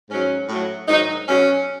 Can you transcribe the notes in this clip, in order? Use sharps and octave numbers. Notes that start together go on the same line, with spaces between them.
G#2 F#3 C#4
A2 F#3
G#2 D#3 F#3 D#4
B2 F#3 C#4